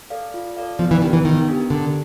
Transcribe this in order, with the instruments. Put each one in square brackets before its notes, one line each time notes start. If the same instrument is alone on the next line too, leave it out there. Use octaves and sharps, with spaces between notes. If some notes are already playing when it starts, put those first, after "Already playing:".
[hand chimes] A4 D5 F5
F4
A4 D5 F5
[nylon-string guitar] F3 [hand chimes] B3
[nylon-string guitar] E3
[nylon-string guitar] D#3 [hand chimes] D4 G4 A#4
[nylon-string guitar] E3
[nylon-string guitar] D#3 [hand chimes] B3
[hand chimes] D4 G4 A#4
[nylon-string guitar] D3 [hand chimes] D4